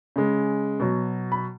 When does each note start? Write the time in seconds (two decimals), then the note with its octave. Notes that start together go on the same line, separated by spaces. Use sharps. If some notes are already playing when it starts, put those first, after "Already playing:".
0.16 C#3 G#3
0.80 B2 F#3
1.32 B5